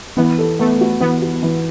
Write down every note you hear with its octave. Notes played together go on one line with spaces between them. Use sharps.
E3 B3
A4
A3 B3
F#4
E3 B3
F#4
E3